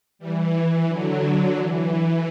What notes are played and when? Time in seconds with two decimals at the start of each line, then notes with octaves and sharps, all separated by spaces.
0.19 E3 G3
0.53 E3
0.87 D3 F#3
1.57 E3